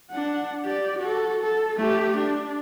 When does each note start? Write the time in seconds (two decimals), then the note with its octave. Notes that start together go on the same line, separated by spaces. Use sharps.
0.11 D4 F#5
0.65 G4 D5
0.99 F#4 A4
1.42 A4
1.77 A3 G4
2.18 D4